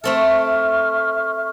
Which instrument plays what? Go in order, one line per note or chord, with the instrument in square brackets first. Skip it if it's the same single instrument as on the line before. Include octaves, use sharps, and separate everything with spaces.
[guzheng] A3 C4 A4 [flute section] E5 C#6 F6